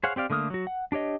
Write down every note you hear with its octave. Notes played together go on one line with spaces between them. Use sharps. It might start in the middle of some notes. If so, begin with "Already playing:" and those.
G#4 C5 C#5 F5 F#5
C4 G4 D5 F5
D3 A3 A#3 D#6 F6
F#3 F#4
F#5
D4 G4 C#5 D#5